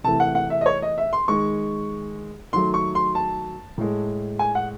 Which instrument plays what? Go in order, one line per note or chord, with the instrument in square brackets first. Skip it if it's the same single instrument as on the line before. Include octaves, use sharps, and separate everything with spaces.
[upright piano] C3 E3 A3 A5
F#5
F#5
E5
D#5
C#5
D#5
E5
C6
D#3 G#3 C#6
D#3 F#3 A3 C6
C#6
C6
A5
A2 G#3
G#5
F#5